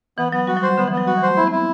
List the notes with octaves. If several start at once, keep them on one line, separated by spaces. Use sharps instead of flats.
E3 B3
F#3 B3
G3 F#4
F#3
G3 C5
D3 B3
E3
B3
F#3
G3 F#4
E3
A3 C5
B3 E4
C4
E4
B3